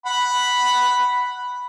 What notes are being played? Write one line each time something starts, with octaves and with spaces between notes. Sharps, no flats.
F#5 B5